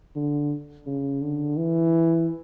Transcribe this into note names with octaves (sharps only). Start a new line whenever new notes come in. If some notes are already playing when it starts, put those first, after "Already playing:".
D3
C#3
D3
E3